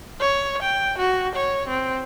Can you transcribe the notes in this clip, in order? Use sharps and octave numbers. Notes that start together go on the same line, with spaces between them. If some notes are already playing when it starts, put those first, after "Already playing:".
C#5
G5
F#4
C#5
C4